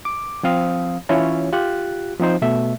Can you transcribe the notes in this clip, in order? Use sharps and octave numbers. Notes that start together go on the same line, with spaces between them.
D6
F3 C4 F5 D#6
E3 C#4 E4 F4 C#5
F4 G4 F#6
F3 C4 D#4 C5
B2 A3 E5